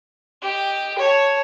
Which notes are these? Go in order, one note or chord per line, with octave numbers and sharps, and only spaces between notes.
G4 D#5
C#5 A5